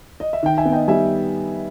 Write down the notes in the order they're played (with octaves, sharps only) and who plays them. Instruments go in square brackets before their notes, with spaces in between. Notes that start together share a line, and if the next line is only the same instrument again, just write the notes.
[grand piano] D#5
E5
D#3 G5
E5 G#5
B3
D#5 G5
G3 E5 G#5